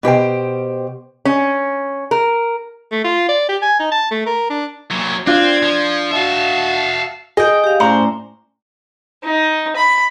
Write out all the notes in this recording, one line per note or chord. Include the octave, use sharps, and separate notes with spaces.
B2 G4 C5 G5
C#4
A#4
A3
F4
D5
G4
G#5
D#4
A5
A3
A#4
D4
A#2 F#3
C4 D4 F4 G#6
F3
F#4 E5 F5 A5
G#4 D#5 G5
G4 F5
A2 A3 C#4 C5 D5 G#5 A#5
D#4
B5